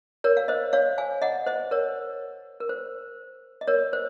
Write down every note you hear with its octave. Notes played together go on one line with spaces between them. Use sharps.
A#4 C#5
F5
C5 D#5
C#5 F5
F5 G#5
D#5 F#5
C5 D#5
A#4 C#5
A#4
C5
D#5
A#4 C#5
C5